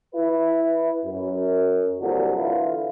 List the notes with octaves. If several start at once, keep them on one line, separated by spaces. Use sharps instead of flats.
E4 B4
F#2
C2 A#2 D3 F#3
D3 E3 E4 F4